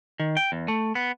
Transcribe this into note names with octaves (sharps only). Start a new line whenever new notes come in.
D#3
G5
E2
A3
B3